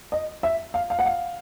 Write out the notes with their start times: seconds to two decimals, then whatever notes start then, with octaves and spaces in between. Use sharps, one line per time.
0.12 D#5
0.43 E5
0.74 F5
0.90 F5
0.99 F#5
1.06 F5